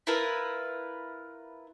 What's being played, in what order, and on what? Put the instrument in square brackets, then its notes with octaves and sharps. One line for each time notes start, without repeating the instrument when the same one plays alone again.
[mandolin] E4 F4 A#4 B4